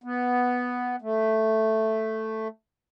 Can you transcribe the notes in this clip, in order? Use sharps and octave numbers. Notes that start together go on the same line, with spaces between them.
B3
A3